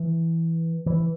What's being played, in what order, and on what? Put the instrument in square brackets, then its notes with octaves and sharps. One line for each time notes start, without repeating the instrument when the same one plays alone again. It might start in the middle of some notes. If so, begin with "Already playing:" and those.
Already playing: [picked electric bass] E3
E3